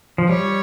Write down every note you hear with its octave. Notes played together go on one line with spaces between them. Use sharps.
F3
G3 C#5